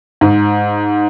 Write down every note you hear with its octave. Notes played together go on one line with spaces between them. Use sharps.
G#2